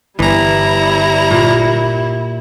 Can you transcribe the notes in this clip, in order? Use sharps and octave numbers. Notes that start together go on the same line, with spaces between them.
G1 E3 G3 E4 A#5
A#2